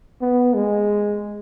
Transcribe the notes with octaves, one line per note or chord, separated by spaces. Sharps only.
B3
G#3